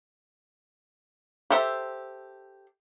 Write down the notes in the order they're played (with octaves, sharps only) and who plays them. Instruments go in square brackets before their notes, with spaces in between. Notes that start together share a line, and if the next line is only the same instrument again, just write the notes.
[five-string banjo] G4 A4 C5 E5